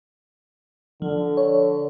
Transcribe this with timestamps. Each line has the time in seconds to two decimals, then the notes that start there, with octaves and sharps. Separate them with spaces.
1.02 D3 F3
1.37 C#5